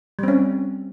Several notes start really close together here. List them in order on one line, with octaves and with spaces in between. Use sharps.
G3 C4 C#4